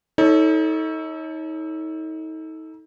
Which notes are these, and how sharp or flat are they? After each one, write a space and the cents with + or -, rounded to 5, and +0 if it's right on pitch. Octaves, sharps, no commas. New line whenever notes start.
D#4 +35 A4 +0 C#5 +0